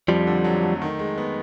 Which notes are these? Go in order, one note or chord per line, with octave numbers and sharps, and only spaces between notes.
F2 F3 G3
D3
F#3
A3
D#3
G#3
B3